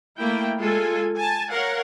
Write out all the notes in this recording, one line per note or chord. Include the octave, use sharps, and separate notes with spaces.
A3 A#3 E4 G5
G#3 F4 A4 G#5
G#5 A5
A#4 C#5 F5 F#5